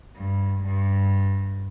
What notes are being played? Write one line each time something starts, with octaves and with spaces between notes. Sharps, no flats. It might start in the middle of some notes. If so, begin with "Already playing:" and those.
G2
G2